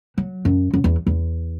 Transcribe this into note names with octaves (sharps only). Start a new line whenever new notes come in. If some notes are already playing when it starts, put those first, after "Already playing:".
F#3
F#2
F#2
E2
E2